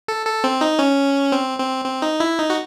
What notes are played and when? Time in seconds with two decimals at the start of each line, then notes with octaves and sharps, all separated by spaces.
0.08 A4
0.26 A4
0.44 C4
0.61 D#4
0.79 C#4
1.32 C4
1.59 C4
1.85 C4
2.02 D#4
2.20 E4
2.39 D#4
2.50 F#4